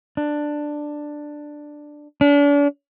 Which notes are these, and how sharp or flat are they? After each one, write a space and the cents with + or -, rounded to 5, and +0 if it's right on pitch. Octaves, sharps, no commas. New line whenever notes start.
D4 +10
D4 -40